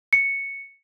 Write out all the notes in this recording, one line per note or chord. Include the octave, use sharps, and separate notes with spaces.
C#7